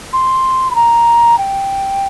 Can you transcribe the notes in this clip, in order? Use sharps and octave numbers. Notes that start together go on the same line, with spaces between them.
C6
B5
A#5
G5